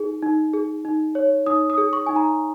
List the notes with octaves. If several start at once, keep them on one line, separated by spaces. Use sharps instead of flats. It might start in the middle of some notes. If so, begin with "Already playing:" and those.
Already playing: D#4 G#4
D#4
G#4
D#4
C#5
D#4 D#6
D#6
G#4
C#6
D#4 G#5
A#5